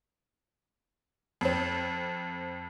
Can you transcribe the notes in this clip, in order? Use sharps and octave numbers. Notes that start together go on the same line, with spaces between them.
F2 C4